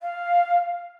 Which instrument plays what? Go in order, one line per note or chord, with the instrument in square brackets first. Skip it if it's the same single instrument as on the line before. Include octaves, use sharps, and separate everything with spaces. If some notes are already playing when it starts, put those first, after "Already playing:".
[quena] F5